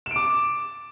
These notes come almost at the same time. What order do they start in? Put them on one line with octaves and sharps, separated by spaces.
E7 D7 D6